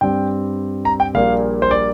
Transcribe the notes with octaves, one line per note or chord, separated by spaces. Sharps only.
G2 G3 C4 G5
A#5
G5
A#1 A#2 G3 A#3 F5
C5
D5